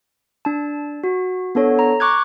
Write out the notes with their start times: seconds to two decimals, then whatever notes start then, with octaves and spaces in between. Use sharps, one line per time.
0.45 D4 A5
1.04 F#4
1.55 B3 D4 A4 C#5
1.79 A#5
2.00 C#6 D6 F#6 G#6